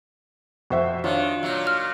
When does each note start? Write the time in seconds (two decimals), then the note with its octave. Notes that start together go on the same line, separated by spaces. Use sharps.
0.70 F2 F#4 C5 E5
1.04 D#3 D4 F4 C#5 F5
1.43 A#2 F#3 E5
1.67 F6